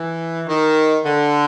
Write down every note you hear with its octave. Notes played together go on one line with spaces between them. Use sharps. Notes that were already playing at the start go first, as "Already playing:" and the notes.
Already playing: E3
D#3
D3